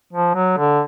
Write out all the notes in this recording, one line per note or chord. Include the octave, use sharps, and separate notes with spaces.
F3
F#3
D3